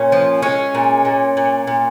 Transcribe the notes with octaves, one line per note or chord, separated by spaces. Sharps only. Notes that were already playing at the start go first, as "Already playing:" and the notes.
Already playing: A#2 C#4
F3
G#3 C#4
A#2
A#2
A#2
A#2